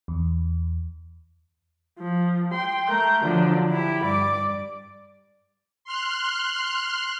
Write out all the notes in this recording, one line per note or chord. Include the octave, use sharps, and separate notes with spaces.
E2
F3
G5 C6
A3 A#4 G6
D3 F3 F#3 D4
E4 G4
G2 D5 D6
C6 F6 F#6